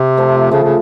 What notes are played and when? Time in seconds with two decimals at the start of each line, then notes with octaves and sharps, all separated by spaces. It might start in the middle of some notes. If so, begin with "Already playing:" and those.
Already playing: C3 C4
0.17 F3 A3
0.51 C#3 F3 A3
0.63 C#3